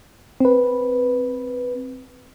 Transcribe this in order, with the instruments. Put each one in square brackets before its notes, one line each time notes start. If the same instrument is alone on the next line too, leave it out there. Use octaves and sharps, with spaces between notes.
[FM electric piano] C4 B4